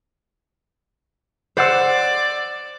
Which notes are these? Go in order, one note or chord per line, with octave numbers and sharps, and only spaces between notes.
C5 D5 F#5 E6